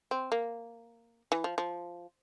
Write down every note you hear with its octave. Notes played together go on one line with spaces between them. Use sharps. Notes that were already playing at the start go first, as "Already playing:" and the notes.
C4
A#3
E3
F3
F3